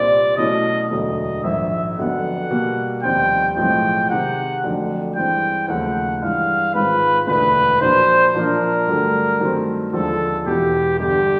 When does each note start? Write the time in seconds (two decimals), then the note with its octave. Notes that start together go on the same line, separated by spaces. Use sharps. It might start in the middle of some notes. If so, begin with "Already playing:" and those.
Already playing: C2 A#2 G3 C4 D5
0.37 B2 F#3 A3 C#4 E4 D#5
0.91 E1 D2 D3 F#3 D#5
1.43 A#1 G#2 D#3 E5
1.97 F2 D3 F#3 B3 F#5
2.50 B2 G3 A#3
3.03 F1 D#2 D#3 G3 C4 G5
3.56 B1 A2 F3 G#3 C4 G5
4.09 C3 D#3 G#3 F#5
4.63 F2 D3 F#3 A3
5.16 G2 E3 G#3 C4 G5
5.68 D#2 C#3 F3 A3 F#5
6.21 G2 E3 G#3 F5
6.74 G#2 D#3 G#3 C4 F4 B4
7.27 E1 D2 D3 B4
7.81 A#2 F3 A#3 D4 F#4 C5
8.34 A#2 F3 A#3 D4 A#4
8.87 G2 D3 F#3 A3
9.40 G2 D#3 F#3 A3 C4
9.93 D#2 D3 F3 G#3 A4
10.46 E1 E2 B2 G4
10.99 G1 G2 D3 G4